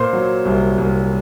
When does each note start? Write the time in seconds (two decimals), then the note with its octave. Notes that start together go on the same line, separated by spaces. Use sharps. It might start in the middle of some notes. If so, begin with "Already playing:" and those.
Already playing: A#2 C5 C6
0.13 F#3
0.45 C2
0.78 C2